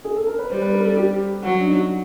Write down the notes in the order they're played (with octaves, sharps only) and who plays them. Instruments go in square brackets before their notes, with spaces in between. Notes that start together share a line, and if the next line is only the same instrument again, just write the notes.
[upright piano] G#4
A4
A#4
B4
[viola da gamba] G3 [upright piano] C5
[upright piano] B4
A#4
A4
G4
[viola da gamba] F#3 [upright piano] F#4
[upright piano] D4
D#4